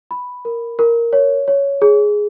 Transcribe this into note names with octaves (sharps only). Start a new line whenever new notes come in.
B5
A#4
A#4
C#5
C#5
G#4